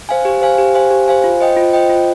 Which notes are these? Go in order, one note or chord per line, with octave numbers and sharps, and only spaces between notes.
C5 F5 G#5
G4
C5 F5 G#5
G4
C5 F5 G#5
G4
C5 F5 G#5
F4
C5 D#5 G5
F4
C5 D#5 G5
F4